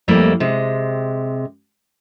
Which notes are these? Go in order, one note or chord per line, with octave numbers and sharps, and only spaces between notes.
F2 G3 A3 A#3 E4
C3 G#3